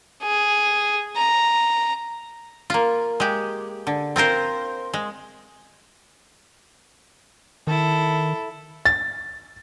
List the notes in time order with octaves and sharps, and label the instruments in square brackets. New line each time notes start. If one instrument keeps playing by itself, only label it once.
[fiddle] G#4
A#5
[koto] A#3 F4
G#3 G4
D3
C4 F4 A#4 C5
G#3
[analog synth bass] D#3 [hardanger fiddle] E4 A4
[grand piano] A6